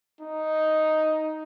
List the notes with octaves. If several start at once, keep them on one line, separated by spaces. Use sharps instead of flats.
D#4